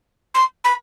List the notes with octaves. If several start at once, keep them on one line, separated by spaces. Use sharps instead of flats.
C6
B5